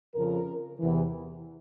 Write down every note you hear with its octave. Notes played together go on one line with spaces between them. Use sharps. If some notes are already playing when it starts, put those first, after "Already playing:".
F2 C#3 F3 A#4
E2 C3 E3